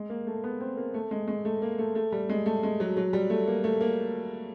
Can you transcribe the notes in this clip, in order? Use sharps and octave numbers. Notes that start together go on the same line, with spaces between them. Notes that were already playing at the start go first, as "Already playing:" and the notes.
Already playing: G#3
A#3
A3
B3
C4
A#3
A3
G#3
G#3
A3
A#3
A3
A3
G3
G#3
A3
G#3
F#3
F#3
G3
A3
A#3
A3
A#3